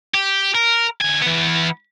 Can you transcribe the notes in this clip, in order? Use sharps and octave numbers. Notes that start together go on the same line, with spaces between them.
G4
A#4
D2 G#5
E3 B3